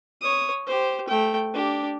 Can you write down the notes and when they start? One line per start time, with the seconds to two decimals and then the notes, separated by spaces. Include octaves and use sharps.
0.21 C#5 D#6
0.66 G4 C5
1.08 A3 G5
1.53 D4 G4